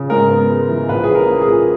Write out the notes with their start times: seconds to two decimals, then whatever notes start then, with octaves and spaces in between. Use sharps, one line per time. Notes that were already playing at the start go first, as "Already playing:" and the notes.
Already playing: C#3
0.10 G#2 A#4
0.29 B3
0.50 G#3
0.69 E3
0.89 A#1 B4
1.04 G#4
1.09 C#4
1.15 A#4
1.27 A#3
1.41 G#4
1.47 A#2